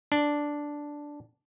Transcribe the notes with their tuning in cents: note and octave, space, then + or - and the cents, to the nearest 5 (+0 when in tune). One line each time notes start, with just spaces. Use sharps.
D4 -5